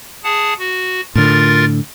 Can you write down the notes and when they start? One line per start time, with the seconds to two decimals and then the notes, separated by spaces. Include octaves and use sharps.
0.24 G#4 F#5 A5
0.59 F#4
1.15 A2 D3 F4 A#4 A6